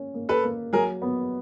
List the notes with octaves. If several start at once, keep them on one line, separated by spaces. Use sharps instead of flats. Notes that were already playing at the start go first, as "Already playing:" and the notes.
Already playing: A#3 C#4
A#3
A4 B4
A#3
F#3 G#4 A#4
B3